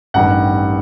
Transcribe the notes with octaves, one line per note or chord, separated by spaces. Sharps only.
A1 G2 D#3 F#5